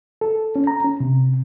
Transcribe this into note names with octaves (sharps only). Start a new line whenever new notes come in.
A4
C#4
A#5
C#4
C3